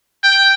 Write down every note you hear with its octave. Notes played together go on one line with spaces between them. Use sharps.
G5